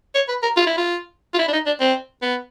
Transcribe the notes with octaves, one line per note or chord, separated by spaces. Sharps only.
C#5
B4
A#4
F4
E4
F4
F4
E4
D4
D#4
D4
C4
B3